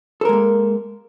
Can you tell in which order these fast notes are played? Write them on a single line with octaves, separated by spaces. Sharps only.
A4 A#4 G#3 A#3